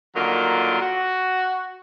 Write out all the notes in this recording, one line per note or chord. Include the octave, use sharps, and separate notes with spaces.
D3 D#3 F#3 A#3 F4
F#4